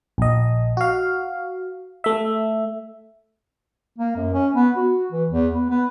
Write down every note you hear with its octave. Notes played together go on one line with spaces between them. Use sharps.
A#1 D#5
F#4 F5
A3 E5
A#3
F#2
C#4
B3
F#4
E3
E2
B3
B3